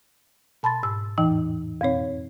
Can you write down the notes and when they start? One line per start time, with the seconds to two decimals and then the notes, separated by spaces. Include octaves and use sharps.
0.63 B2 A5 B5 C6 A6
0.83 G#2 E6
1.18 E2 A2 E3 D#4 G5
1.81 F2 B2 C4 C#5